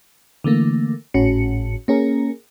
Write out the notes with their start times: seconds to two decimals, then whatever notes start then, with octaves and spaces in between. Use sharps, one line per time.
0.44 D3 E3 A3 A#3
1.14 G#1 A2 C#4 F#4 C#7
1.88 A#3 C#4 G#4 A#4